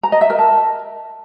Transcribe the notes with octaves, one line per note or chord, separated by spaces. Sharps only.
A#5
D#5
E5
A#4
A5